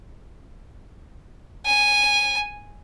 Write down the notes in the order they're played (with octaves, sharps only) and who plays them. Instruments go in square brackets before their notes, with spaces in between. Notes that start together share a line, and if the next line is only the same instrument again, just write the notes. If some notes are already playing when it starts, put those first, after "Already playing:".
[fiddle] G#5